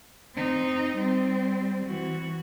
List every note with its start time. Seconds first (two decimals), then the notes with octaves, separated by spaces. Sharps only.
0.35 C4 D#4
0.97 G3 C4
1.85 E3 F#4